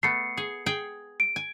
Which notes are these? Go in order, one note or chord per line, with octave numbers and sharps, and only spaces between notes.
A3 B3 C7 C#7
G#4
G#4 G5
D7
G#5